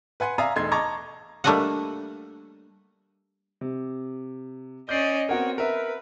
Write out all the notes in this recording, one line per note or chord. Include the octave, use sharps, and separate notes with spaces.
B4 F#5 G#5 C6
D5 E5 F5 G#5 A#5 D#6
E1 A3 D#4 C6 G#6
D#5 A5 A#5 C#6 D6 G#6
G3 A3 A#3 D4 D#5 F#5
C3
C#4 D5 D#5 G6 C7
B3 C4 F#4 A#4 C#5
A#4 B4 E5